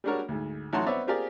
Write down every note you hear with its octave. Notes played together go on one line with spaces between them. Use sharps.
G3 G#3 D4 F#4 A#4 C#5
D2 G#2
A1 F#3 D#4 F#5 A5 C6
B3 C4 C#5 D5 E5
C4 F4 G4 G#4 A#4 D5